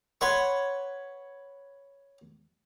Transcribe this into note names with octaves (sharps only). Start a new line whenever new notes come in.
B4 C#5 F#5 C6 C#6